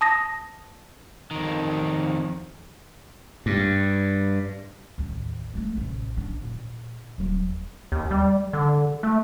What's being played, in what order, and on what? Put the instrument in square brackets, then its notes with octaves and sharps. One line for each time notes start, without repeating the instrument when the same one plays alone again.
[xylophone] A5 D#6 A#6
[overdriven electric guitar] F2 D#3
[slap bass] G2
[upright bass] A1 D#2
G#3 A3
A1 C3
C#4 D4
A#2
D#1 F#3
[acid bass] D#2
G3
D3
A3